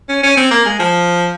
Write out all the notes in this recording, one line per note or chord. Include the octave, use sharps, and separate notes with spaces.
C#4
C#4
C4
A#3
G#3
F3